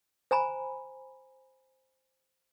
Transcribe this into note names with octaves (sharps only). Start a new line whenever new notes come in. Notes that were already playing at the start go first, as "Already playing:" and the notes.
C5 G#5 A#5 B5